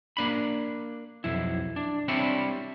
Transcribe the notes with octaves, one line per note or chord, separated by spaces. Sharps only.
A#3 D4 B5
B1 F2 E4
D4
G3 C4 D4 E4 C#5 E5